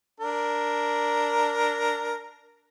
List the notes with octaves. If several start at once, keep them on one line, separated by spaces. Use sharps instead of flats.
D4 A#4